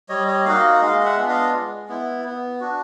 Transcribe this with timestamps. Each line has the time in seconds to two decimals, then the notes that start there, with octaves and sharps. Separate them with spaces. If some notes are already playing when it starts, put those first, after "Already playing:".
0.09 G3 C#5 D#5
0.28 C#5 D#5
0.45 A#3 D#4 F#4 D#5 F5
0.81 G#3 D#5 F5
1.00 F5
1.05 E5 F#5
1.17 B3 D4 F4
1.29 D#5 F5
1.53 G#3
1.89 B3 E4
2.25 B3
2.60 D4 F#4